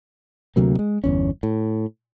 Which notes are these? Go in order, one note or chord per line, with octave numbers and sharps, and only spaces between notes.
D2 C3 F#3 A#3
G#3
G1 E2 C#4
A2